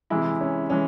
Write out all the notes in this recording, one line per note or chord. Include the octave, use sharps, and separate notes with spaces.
C3 E3 G#3 E4
C#4
E3 G#3 C#4